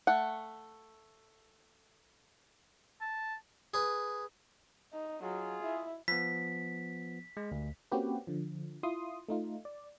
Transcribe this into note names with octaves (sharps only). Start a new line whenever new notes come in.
A3 F#5
A5
G#4 B4
D#4
F#3 F4 G#4
E4
F3 B3 B6
G#3
D2
A#3 C4 C#4 F#4 G4 B4
D3 F3
E4 F4 C6 D#6
A3 D#4 F4
D5